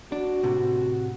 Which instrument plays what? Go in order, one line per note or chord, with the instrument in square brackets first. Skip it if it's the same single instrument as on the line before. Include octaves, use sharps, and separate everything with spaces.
[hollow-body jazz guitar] D4 [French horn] F#4
[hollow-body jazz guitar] A2 C3